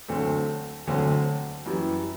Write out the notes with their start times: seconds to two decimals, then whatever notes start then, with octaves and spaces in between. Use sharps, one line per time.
0.08 D2 D3 F#3 A3 C4
0.87 D2 D3 F#3 A3 C4
1.66 F#2 E3 G3